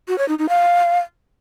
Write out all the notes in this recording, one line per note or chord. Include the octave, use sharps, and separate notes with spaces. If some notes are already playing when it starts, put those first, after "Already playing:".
F#4
C#5
D#4
D#4
F5